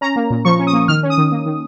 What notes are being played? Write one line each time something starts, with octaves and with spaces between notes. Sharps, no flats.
C#4 A#5
A#3
A#2
F3 C#6
C#4
D#6
A#3
D#3 F6
C#4
D#6
D#3
A#3
D#3